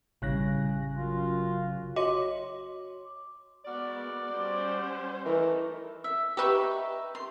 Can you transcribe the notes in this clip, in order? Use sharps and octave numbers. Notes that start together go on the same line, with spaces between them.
A1 C#3 G3 F#6 A#6
F#2 F4
F#4 C#5 D#5 C6 D6
G#3 B3 F#4 A#4 D5
G3 C#4 C5
E3 A3 D#4 A4 A#4
E5
D#4 G4 B4 E5 C#6
C6